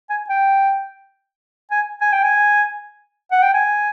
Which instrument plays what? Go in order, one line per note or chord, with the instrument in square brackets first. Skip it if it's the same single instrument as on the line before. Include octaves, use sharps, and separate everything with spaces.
[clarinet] G#5
G5
G#5
G#5
G5
G#5
F#5
G5
G#5